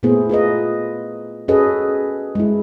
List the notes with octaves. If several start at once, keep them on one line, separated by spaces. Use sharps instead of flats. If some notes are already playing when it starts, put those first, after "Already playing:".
A#2 A3 B3 E4 G#4 C5
F4 G#4 B4 D#5
C#4 F#4 G#4 A4 B4 D#5
G#3 E4